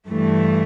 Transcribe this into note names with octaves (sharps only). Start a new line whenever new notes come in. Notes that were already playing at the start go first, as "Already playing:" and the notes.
G2 E3 A3